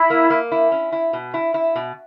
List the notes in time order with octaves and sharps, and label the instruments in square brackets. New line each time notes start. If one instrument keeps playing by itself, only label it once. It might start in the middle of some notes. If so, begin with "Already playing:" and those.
Already playing: [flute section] E4
[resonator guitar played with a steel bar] A#3
A#3
E4
C#4
E4
B2
E4
E4
B2